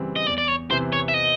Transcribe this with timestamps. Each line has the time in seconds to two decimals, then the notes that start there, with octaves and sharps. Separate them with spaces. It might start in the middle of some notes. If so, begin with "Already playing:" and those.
Already playing: C#3 E3 G3 C4
0.16 D#5
0.27 E2 D5
0.38 D5
0.48 C#5
0.70 C3 E3 C5
0.93 C#5
1.08 E5
1.14 D#5